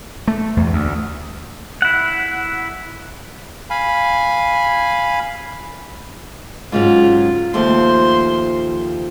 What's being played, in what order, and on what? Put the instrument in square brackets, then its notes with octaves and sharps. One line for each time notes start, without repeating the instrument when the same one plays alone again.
[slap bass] A3
E2
D2
[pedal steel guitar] E4 F#5
[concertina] F5 G#5 B5
[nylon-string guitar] G#2 C#3 F#3 [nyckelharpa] F4
[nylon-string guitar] D#2 F3 A3 [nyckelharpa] C5 C6